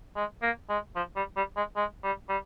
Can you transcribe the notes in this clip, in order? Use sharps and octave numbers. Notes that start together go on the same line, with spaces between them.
G#3
A#3
G#3
F3
G3
G3
G#3
G#3
G3
G3